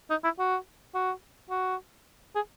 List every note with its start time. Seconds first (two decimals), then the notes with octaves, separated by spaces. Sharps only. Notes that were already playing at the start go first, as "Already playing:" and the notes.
0.10 D#4
0.24 E4
0.39 F#4
0.94 F#4
1.50 F#4
2.35 G#4